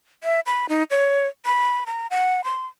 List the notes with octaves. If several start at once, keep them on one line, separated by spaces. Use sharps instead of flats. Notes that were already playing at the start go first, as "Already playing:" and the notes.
E5
B5
D#4
C#5
B5
A#5
F#5
C6